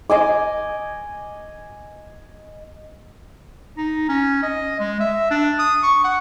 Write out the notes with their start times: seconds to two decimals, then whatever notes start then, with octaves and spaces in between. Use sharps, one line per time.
0.10 D#5 G#5 D6
3.77 D#4
4.09 C#4
4.43 D#5
4.80 G#3
5.00 E5
5.31 D4
5.59 D#6
5.83 C#6
6.04 F#5